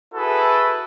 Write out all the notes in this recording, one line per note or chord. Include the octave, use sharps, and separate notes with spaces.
E4 F#4 G#4 A4 B4